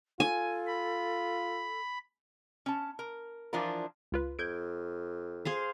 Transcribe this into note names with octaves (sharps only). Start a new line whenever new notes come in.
F4 A4 G#5
B5
C#4 A5
A#4
E3 F3 D4 F4 A#4
C#2 F4 B4
F2 G6 G#6 D7
G#4 C5 F5